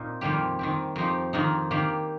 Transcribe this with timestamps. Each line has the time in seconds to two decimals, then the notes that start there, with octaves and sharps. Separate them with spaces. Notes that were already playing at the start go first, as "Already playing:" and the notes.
Already playing: A#2 C4 D#4
0.21 F2 D#3 G3 A#3 G4
0.59 D#3 C4 G4
0.96 F2 F3 D#4 G4
1.33 F2 D#3 A#3 D#4
1.71 D#3 A#3 G4